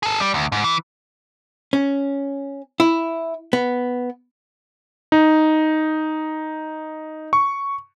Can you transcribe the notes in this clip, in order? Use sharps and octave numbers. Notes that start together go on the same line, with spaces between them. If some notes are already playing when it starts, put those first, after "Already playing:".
G#4 A4
G3
D2
G#2
E3
C#4
E4
B3
D#4
C#6